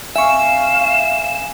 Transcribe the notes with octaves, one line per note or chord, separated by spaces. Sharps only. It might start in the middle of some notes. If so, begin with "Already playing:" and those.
C4 E5 F5 G#5 C#6 E7